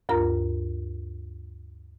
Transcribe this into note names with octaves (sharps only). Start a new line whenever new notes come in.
D2 G2 F4 A#4 A#5